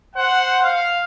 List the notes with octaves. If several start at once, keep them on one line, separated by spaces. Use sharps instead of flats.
C5 F#5
F5